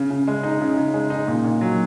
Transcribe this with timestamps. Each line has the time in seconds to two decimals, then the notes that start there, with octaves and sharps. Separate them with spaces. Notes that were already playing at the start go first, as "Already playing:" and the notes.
Already playing: C#3
0.10 C#3
0.27 G#3
0.43 D#4
0.61 C#3
0.77 C#3
0.94 G#3
1.10 D#4
1.28 A#2
1.44 A#2
1.61 F#3